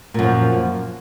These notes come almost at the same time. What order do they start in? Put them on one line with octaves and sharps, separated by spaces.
A#2 F#2 F3